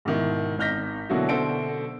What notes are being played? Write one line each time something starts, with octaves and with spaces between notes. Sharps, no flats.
G#2 B2 D#3 E4
G#1 D#4 F6 G6 A#6 B6
B2 D3 F#3 A#3 E4 F#4
B2 D3 A4 C5 E5 D7